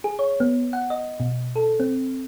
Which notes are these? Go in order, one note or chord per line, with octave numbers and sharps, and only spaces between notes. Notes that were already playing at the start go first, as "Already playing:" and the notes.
G#4
C#5
B3
F#5
D#5
B2
A4
C4